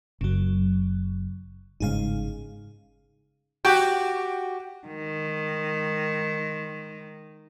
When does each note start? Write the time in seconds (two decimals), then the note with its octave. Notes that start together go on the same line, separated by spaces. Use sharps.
0.21 F#1 F#2 C#3 F#3
1.80 G1 G#2 C#3 D#4 G#4 F5
3.65 F#4 G4 G5
4.88 D#3 G#3